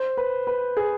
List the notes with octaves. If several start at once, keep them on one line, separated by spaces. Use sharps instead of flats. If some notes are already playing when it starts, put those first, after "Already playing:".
Already playing: C5
B4
B4
G#4